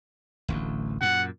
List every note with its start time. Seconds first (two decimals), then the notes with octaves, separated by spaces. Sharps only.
0.48 D1 A1 D2
1.01 F#2 A#2 F#5